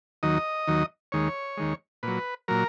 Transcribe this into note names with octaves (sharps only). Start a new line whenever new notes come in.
D#2 D#3 F#3 D#5
D#2 D#3 F#3
D#2 D#3 G#3 C#5
D#2 D#3 G#3
A#2 F#3 B4
A#2 F#3 A#4